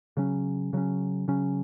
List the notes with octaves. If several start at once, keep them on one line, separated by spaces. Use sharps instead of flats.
C#3 F#3 C#4
C#3 F#3 C#4
C#3 F#3 C#4